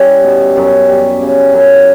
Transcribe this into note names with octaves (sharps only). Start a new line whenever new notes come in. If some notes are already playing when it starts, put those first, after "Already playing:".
Already playing: G3 C#4 E4
B2
F#2
G3
C#3
F#2